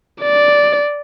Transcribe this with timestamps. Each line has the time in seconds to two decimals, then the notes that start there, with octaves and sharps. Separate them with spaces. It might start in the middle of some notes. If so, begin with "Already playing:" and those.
0.22 D5